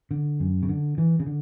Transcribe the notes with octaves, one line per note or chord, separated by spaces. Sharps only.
D3
F#2
C#3
D3
E3
C#3
D3